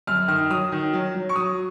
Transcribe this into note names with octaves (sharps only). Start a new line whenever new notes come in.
F#2 F6
D#3 F6
F#3 D#6
D#3
F#3
F#3
C#6
F#3 D#6